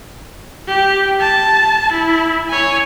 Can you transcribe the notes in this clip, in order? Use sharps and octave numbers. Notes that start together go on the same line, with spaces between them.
G4
A5
E4
C#5 G#5